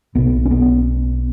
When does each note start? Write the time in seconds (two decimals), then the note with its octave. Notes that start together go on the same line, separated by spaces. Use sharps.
0.15 B1 B2 B3
0.45 C#4
0.51 B3